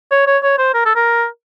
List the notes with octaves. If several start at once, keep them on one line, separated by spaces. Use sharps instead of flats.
C#5
C#5
C#5
C5
A#4
A4
A#4